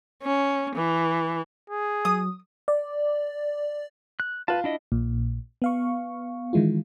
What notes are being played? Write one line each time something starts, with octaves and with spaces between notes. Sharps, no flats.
C#4
E3
G#4
F#3 D#6
D5
F#6
F4 B4 A5
D4 E4 D#5
A#1 A#2
B3 F5 C#6
D#3 E3 G#3 E4 F4